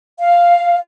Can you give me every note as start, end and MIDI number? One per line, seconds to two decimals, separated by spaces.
0.18 0.77 77